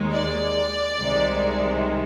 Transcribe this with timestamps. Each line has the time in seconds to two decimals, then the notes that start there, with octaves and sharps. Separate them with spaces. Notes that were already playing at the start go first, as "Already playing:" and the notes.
Already playing: D#2 D#3 G#3
0.12 D5
1.00 C2 C3 D#3 G#3